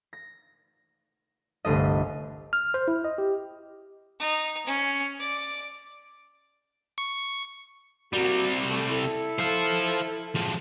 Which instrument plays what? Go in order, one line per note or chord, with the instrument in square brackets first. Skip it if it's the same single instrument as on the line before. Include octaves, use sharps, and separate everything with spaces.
[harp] A#6
G1 C2 A3 D#5
[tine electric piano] F6
C5
E4
D#5
G4
[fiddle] D#4
C#4
D5
[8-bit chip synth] C#6
[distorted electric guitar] C3 G3 [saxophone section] A#3 F#4
[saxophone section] A3
E4 A4
[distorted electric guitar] C5 F5
F3 G#3